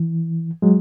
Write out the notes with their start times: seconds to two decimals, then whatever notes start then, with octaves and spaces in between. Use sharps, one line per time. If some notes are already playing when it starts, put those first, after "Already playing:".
Already playing: E3
0.62 F#3 G#3